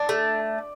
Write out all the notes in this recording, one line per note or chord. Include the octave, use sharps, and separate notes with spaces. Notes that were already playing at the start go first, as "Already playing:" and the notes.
Already playing: D4 D5
A3